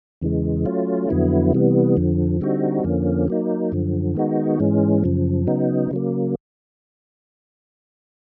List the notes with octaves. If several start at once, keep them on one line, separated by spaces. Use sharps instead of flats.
E2 C#3 E3 G#3
F#3 A3 C#4 F4
F2 D3 F#3 B3 E4
C3 E3 G3 B3
F2 D3 F3
D3 G3 C4 D#4 F#4
F2 D3 F3 A#3 C#4
F#3 A#3 D#4
F#2 D3 F3
D#3 G#3 B3 D#4 F#4
G#2 E3 G#3 C#4
F#2 C#3 F3
C#3 F#3 B3 D#4
C#3 F#3 A#3